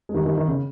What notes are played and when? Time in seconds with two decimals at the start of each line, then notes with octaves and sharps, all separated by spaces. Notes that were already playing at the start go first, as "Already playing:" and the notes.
0.09 G#3
0.14 D#3 G3
0.25 D#3 G3
0.37 D#3
0.48 C#3